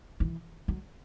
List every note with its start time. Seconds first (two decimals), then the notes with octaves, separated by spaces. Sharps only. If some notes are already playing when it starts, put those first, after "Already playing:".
0.20 E3
0.68 F#3